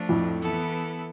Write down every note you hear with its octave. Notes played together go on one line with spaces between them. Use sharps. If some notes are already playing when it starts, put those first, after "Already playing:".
Already playing: F3 A3 D4
F2 A2
E3 B3 E4 A4